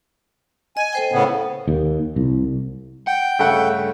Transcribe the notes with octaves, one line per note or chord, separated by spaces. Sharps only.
D#5 G#5
A4 C5 G5
A2 C#3 B3
D#2
C2
F#5 G5
G2 C#3 A3 A4 E5 F#5